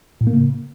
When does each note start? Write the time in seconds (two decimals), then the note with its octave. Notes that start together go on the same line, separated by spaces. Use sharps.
0.21 A2
0.27 A#3
0.33 C#3